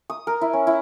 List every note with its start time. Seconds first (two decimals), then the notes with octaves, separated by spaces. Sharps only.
0.10 D#6
0.27 A#4
0.41 E4
0.53 C#4
0.67 E4